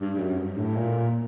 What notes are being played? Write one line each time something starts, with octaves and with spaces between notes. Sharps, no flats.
G2
G2
F#2
G2
A2
A#2